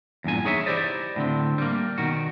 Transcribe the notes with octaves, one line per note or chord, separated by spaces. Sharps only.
E2 G2 A#2 G#5
D#4 G#4 C#5 D#5 E5
E4 G4 C5 D5 D#5
A2 D3 C4
G3 A#3
B2 D#3 F#4